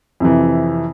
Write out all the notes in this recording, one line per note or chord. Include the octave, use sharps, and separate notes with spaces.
F2 C3 E3